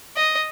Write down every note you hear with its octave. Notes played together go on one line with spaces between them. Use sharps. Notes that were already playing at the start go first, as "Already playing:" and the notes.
D#5